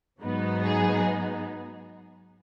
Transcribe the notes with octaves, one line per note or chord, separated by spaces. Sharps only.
G#2 F#3 B3 D#4
G#4